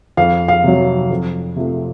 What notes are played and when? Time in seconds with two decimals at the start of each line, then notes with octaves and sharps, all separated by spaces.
0.17 F2 F5
0.48 F5
0.64 C3 F#3
1.10 F2
1.56 C3 F3 A3